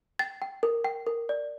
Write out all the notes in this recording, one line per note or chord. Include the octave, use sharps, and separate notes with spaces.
G5 A6
G5
A#4
G5
A#4
D5